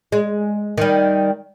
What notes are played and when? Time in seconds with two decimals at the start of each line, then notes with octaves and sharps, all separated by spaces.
0.12 G#3
0.78 D#3 G3